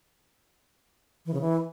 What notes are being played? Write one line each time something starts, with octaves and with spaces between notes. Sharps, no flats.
E3
C#3
E3